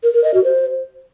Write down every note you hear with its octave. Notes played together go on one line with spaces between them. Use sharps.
A#4
A#4
D#5
F#4
C5